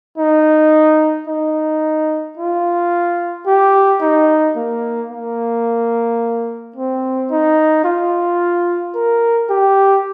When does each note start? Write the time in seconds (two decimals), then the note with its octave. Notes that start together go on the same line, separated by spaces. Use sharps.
0.18 D#4
1.27 D#4
2.37 F4
3.47 G4
4.01 D#4
4.56 A#3
5.11 A#3
6.76 C4
7.30 D#4
7.84 F4
8.95 A#4
9.49 G4